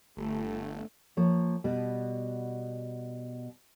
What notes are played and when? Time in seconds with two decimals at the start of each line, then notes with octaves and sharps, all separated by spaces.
0.17 G1 A3
1.17 F3 A#3 C#5
1.64 B2 G3 B3